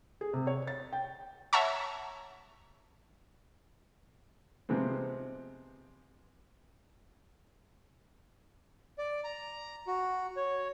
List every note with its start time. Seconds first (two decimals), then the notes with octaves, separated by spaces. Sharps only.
0.21 G#4
0.33 C3
0.47 C#5
0.67 A6
0.93 G5
1.53 C#5 E5 F#5 A5 A#5 C#6
4.69 C3 F3 G#3 B3 C4
8.98 D5
9.24 A#5
9.87 F#4
10.37 C#5